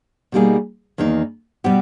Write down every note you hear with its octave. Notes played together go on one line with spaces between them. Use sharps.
B2 G3 A#3 D#4 G#4
E2 D#3 A#3 D#4
B2 G3 B3 G4